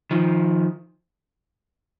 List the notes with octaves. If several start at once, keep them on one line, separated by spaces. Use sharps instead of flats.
D#3 F3